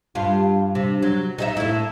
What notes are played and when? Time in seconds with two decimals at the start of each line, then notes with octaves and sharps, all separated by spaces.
0.15 G2 F4
0.75 C3
1.02 F#3
1.38 D#4 F#4 E5
1.57 A2 E4